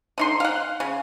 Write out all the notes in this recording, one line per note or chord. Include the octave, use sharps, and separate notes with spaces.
D3 D#4 C6
F5 F#5
C#3